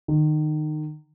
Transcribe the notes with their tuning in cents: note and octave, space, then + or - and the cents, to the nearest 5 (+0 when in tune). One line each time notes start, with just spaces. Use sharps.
D#3 -25